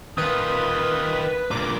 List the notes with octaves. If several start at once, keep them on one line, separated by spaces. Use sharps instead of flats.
D#3 F4 B4 D#6
G2 A#2 D6